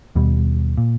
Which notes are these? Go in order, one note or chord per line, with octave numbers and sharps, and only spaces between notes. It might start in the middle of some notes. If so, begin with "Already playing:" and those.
D#2 B2 G3
A#2